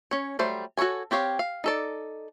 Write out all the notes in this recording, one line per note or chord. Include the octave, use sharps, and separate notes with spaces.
C#4 C#5
F#3 G3 A3 C5
F#4 A4 B4 C#5 G#5
C4 G4 C#5 F5
F5
D#4 A4 D5